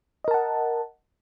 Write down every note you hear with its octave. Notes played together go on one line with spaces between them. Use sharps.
A#4 D#5 F#5 A5